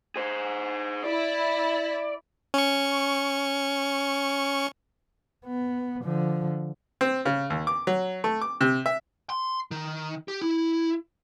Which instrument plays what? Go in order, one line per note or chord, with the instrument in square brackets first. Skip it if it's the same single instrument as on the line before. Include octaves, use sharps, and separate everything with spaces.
[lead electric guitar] G#4 C5
[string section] E4 [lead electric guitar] D5
[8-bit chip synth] C#4 C#6
[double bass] B3
D3 F3
[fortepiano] C4
C#3
D#2
D6
F#3
A3
D6
C3
E5
[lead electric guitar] C6
D#3
G4
E4